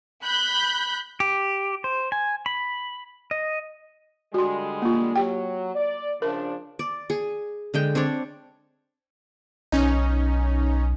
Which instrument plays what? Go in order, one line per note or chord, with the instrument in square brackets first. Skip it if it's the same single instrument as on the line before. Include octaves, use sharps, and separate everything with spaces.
[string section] B5 F#6 G6 B6
[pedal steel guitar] G4
C5
G#5
B5
D#5
[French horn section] D3 G3 G#3 [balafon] F#4 C6
[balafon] A#3 F4
[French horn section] F#3 [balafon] G4 G5
[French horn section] D5
[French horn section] C#3 F3 D4 [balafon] A#4
[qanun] D5
G#4
D3 G#3 G5
C4 D4 C#5 D5
[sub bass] B1 [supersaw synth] C#4 D#4